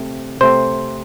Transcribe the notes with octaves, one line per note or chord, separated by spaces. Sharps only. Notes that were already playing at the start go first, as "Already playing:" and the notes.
Already playing: C3 A3 C4
C3 A3 C4 C5